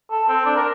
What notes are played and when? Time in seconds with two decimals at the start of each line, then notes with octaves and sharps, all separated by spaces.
0.11 A4
0.28 C4
0.46 D4
0.56 A#4